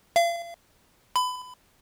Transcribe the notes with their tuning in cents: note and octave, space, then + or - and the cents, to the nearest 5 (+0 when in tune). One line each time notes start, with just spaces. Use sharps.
F5 -40
B5 +25